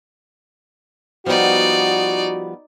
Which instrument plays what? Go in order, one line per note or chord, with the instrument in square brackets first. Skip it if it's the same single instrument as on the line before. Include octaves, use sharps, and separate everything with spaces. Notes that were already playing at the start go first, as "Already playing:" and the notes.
[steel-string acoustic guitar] F3 G3 B3 [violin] D#4 D5 [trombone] F#4